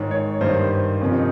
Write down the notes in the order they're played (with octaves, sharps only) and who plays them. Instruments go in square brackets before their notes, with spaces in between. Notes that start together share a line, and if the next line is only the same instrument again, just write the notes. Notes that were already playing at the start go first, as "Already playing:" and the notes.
Already playing: [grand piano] G#2 D#3 C#5
C#5
G2 D#3 C5
C5
F2 C3 D#3 C#4
D#4